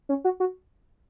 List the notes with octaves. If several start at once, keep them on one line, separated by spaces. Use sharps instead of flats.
C#4
F#4
F#4